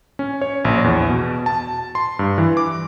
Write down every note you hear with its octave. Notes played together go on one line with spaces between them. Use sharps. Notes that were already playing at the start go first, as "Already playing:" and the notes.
C#4
C#5
A#1
E2
B2
A5
C6
G2
E3
D6